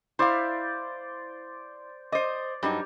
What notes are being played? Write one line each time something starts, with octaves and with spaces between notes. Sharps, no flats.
E4 C5 D5 F5
C5 D5 D#5
G2 F#3 D#4 G4